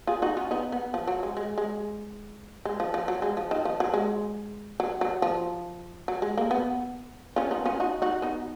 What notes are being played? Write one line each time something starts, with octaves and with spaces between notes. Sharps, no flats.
F4 G#4
D#4 F#4
C#4 F4
B3 D#4
B3
F3
F#3
G#3
G#3
G#3
G#3
F3
F3
F#3
G#3
F3
D#3
F3
F#3
G#3
F#3
F#3
F3
F#3
G#3
A#3
B3
C#4 F4
B3 D#4
C#4 F4
D#4 F#4
D#4 F#4
B3 D#4